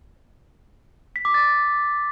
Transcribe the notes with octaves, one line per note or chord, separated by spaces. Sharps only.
B6
D6
A6